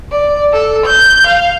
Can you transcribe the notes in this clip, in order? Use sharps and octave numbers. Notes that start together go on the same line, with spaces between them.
D5
A4
G6
F5